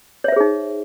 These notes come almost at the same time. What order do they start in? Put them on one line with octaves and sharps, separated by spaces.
C#5 E5 C5 G#4 D#4